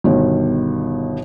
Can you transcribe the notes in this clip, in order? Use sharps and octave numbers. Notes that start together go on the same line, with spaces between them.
G1 B2 D#3